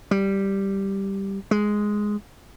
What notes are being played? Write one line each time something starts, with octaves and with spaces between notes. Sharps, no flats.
G3
G#3